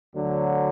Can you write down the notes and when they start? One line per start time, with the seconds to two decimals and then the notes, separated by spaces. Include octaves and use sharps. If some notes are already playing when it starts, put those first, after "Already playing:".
0.13 D2 D3 F#3